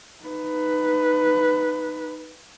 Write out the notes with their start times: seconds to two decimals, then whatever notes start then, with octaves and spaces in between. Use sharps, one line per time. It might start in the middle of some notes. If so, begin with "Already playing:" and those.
0.24 D#4 B4